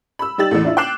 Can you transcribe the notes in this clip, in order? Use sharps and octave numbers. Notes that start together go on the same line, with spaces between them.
B5 E6
G3 D#4 G4 E6 A6 F#7
A1 E2 A2
D4 E4 F4
G5 D6 F#6 C7 E7 F#7